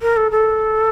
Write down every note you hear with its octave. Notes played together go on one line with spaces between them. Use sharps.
A#4
A4
A4